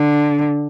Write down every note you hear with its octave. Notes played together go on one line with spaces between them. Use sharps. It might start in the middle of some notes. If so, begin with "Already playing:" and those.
Already playing: D3